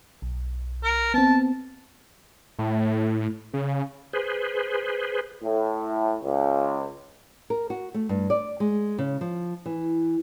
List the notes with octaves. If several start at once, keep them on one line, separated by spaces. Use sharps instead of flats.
B1
A#4
B3 C4 A5
A2
C#3
G#4 B4 C5
A2
C#2
A#4
F#4
A3
G2
D5
G#3
C#3
F3
E3